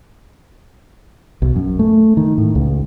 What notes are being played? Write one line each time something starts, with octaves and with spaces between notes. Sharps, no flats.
B1
F#2
A3
D#3
A2
C#2